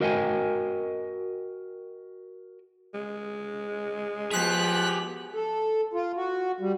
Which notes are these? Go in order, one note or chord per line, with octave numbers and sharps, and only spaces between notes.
F#4 A#4 D#5 F5 G5 G#5
G#3
F3 B3 G4 G#4 F#6 B6
A4
F4
F#4
G3